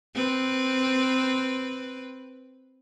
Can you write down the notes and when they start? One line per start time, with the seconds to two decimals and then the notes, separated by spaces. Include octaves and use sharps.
0.15 C4 B4